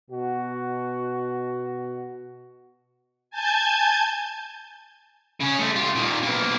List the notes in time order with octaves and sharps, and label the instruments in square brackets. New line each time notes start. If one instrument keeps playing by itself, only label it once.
[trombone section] B2 F#4
[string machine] G#5 A5 G6 G#6
[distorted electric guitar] C#3 C#4
G#3 A3
F4 G4
A#2 D#3
B1 A#3